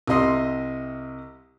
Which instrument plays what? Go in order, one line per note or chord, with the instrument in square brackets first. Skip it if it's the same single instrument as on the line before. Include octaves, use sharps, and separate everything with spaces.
[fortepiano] C2 C3 D#5 C6